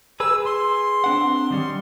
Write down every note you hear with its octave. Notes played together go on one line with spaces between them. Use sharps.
G#4 B4 E6
C6
C4 D4 F#5
D#3 G3 C#4